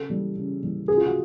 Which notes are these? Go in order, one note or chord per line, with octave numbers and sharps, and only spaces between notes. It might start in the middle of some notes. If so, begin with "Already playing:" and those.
Already playing: C#3 A4
E3 G3
C#3
E3 G3
C#3 G#4
F4
F#4